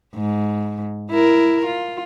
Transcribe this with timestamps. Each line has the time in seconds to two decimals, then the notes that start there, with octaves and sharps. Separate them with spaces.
0.15 G#2
1.10 E4 A#4
1.66 F4